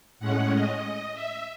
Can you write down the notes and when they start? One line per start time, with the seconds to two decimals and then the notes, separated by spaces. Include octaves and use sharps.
0.19 A2 G#3 C#4 F#5
0.51 D#5
1.14 E5